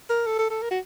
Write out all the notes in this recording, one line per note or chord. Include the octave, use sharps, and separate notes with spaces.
A#4
A4
A4
A4
A#4
F#4